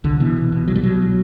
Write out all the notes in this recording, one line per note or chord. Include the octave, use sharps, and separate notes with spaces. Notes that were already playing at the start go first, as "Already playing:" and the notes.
C2 D3
B2 E3
C2
B2
C2 F#3
G3
B2 F#3